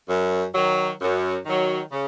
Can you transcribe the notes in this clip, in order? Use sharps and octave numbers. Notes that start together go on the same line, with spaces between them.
F#2
D#3 F#3
F#2
D#3 F#3
C#3